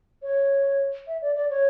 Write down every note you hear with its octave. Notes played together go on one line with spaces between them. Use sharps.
C#5
E5
D5
D5
C#5